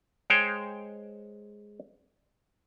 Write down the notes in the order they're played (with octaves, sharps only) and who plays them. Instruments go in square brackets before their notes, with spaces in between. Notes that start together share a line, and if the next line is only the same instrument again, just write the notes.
[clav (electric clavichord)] G#3 C5 C#5 G5